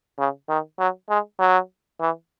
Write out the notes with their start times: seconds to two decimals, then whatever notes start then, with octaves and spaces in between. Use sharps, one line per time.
0.19 C#3
0.49 D#3
0.79 F#3
1.09 G#3
1.39 F#3
2.00 E3